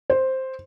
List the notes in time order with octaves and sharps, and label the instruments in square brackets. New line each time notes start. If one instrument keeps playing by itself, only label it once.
[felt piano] C5